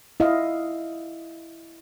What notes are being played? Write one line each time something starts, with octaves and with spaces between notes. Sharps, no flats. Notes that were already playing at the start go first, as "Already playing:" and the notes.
E4 D#5 F5